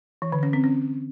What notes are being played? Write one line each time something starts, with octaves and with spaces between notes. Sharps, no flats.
E3
D3
C#4
C4
C#4